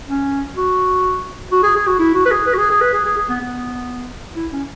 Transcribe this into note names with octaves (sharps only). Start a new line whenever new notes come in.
C#4
F#4
F#4
G#4
G#4
F#4
E4
F#4
B4
G#4
B4
F#4
G#4
G#4
B4
G#4
G#4
G#4
B3
B3
E4
C#4